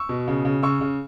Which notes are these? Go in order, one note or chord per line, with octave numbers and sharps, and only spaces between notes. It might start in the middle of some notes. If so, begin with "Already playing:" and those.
Already playing: C#6 E6
B2
C#3
C#3
C#3 C#6 E6
C#3